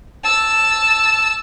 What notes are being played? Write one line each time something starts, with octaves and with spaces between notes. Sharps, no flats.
A5 E6